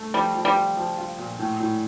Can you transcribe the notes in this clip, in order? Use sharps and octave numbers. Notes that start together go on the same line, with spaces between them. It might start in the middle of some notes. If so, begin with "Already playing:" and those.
Already playing: A3
F3 G3
F3
G3
F4
F3
F4
A#2
A2
A2